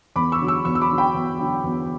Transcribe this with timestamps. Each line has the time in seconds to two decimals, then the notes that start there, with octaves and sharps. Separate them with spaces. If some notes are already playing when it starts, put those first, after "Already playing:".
0.16 E2 B5 D6
0.32 C#6 E6
0.40 D3 F#3
0.48 C#6 E6
0.65 E2 C#6 E6
0.75 E6
0.81 B5 D6
0.90 D3 F#3
0.98 G5 B5
1.14 E2
1.40 D3 F#3
1.64 E2